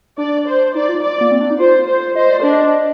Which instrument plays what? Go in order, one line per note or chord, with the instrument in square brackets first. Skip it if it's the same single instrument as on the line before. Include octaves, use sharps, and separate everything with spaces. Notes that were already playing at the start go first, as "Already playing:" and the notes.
[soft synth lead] D4 [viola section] D5
[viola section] C5
[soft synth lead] D#4 [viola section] D5
[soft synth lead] F4
[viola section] D5
[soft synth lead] A#3
C4
D4
D#4
[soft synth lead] F4 [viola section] C5
[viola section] C5
[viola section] C5 [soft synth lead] D#5
[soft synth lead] D5
[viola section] D4 [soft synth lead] D#5